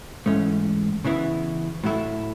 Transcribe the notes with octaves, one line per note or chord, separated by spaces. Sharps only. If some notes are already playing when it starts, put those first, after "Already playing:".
G#2 E3 A3 C#4
C#3 E3 B3 E4
A2 F#3 A3 E4